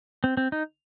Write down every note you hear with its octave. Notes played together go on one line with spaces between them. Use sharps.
C4
C4
D#4